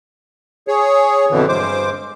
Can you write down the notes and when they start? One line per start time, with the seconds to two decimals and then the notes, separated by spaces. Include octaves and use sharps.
0.68 G#4 C#5
1.31 F2 B2 D3 E3
1.49 G2 G#3 C5 D6